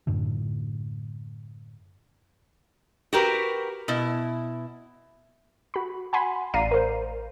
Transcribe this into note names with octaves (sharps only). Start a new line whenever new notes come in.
F#2 A2 D3
F#4 G4 A#4 B4
B2 E4
F#4 B5
F#5 G#5 B5 C6
A1 D5 F5 A#5 C7 D#7
A#4 C5